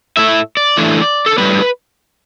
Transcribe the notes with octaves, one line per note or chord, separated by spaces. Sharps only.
A2 A3 E4 E5
D5
E3 A3 D4
A4
A2 G3 B3 B4